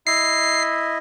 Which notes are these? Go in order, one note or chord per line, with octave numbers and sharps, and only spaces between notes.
E4 D#5 E5 C7